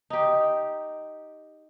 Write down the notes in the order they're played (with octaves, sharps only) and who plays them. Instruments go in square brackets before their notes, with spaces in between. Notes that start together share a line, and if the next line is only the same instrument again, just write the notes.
[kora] D#4 G4